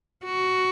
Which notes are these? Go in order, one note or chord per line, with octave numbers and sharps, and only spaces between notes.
F#4